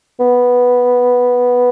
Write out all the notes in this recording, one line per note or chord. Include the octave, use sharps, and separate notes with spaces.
B3